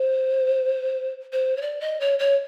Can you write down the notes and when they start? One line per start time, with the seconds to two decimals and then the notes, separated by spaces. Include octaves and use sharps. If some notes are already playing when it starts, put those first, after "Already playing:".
Already playing: C5
1.33 C5
1.57 C#5
1.61 D5
1.81 D#5
2.00 C#5
2.19 C#5